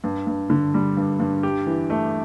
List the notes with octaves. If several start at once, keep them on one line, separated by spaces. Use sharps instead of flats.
G2
G2
D3
G3
G2
G2
G4
E3
A3